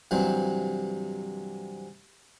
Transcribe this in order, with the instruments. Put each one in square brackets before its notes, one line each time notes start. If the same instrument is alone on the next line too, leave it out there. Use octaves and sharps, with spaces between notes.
[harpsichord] G2 C3 E3 F#3 C4